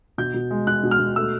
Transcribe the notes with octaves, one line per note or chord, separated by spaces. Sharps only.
B2 G6
B2
G#3
B2 F#6
B2
F6
B2
A3 E6